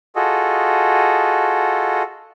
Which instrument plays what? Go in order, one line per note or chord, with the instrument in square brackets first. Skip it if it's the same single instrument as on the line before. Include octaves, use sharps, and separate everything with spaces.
[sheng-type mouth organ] F4 F#4 G#4 A4 D#5